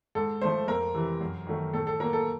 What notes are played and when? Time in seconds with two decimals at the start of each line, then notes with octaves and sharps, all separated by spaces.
0.15 G#2 A4
0.42 F3 A3 C5
0.68 F2 A#4
0.95 C3 E3
1.21 F#2
1.47 D#3 F#3 A3
1.73 A2 A4
1.87 A4
2.00 F#3 A#3 A#4
2.13 A4